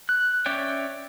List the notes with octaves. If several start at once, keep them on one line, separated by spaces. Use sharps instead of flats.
F#6
C#4 C#5 D5 E5 G5